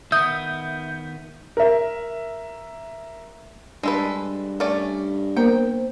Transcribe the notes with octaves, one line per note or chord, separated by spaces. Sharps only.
D#3 B3 E5 D#6 G6
A#4 E5
G2 G#3 A4 B4
A3 C#4 D5
A#3 B3 A#4 C5 G5